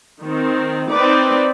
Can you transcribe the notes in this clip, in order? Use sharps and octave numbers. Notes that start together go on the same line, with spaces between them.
D#3 C4
C4 D#4 B4 D5